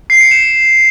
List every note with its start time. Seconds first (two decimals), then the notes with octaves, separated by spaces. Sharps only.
0.10 C7
0.21 C#7
0.31 E7